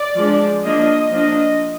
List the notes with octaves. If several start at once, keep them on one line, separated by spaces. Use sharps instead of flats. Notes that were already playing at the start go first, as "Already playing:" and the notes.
Already playing: D5
F3 G#3 D4
F3 A#3 D4 D#5
F3 A#3 D4 D#5